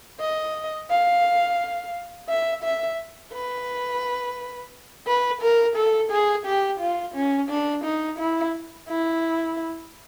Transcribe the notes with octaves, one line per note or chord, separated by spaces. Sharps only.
D#5
F5
E5
E5
B4
B4
A#4
A4
G#4
G4
F4
C#4
D4
D#4
E4
E4